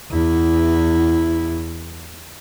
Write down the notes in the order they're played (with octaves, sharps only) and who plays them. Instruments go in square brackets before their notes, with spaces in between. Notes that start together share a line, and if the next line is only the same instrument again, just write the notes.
[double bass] E2 E4